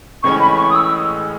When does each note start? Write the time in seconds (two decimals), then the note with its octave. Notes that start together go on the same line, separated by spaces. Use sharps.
0.23 A1 A2 E3 G#3 C#4 C#6
0.40 B5
0.57 C#6
0.70 D#6
0.75 E6